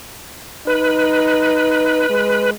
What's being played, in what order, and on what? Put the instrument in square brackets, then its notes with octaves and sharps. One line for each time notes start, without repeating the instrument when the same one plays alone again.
[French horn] D#4 [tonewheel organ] B4
[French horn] G#3